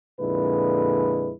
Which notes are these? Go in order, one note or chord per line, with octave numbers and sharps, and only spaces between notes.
F2 A#2 D3 G#3 E4 B4